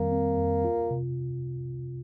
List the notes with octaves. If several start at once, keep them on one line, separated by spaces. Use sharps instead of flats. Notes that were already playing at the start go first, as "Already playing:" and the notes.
Already playing: F2 D#3 G3 A#3 C4
C4
F2
F4
C3